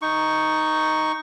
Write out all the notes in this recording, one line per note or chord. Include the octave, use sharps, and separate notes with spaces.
D#4 C#6